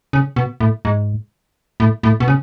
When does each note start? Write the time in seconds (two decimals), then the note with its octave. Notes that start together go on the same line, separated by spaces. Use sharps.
0.13 C#3
0.36 B2
0.60 A2
0.85 G#2
1.80 A2
2.03 A2
2.20 B2
2.28 C#3